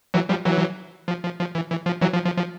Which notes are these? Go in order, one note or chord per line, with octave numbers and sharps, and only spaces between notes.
E3 F#3
F3 G3
E3 F#3
F3
F3
F3
E3
E3
F3
E3 F#3
F3
F3
F3